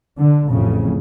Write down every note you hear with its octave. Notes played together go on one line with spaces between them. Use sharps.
D3
A1 F2 C#3